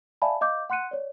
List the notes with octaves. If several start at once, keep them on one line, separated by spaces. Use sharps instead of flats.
D5 E5 F5 G#5 A5 B5
D#5 F5 D6 G6
F#5 C6 F#6 C#7 D#7
C#5 D5